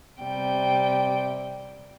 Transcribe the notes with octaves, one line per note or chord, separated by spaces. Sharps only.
C3 G3 G5